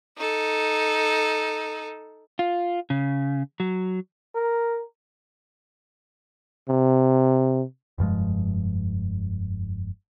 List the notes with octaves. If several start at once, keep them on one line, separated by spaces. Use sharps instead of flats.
D#4 A4
F4
C#3
F#3
A#4
C3
F1 G2 F3 G#3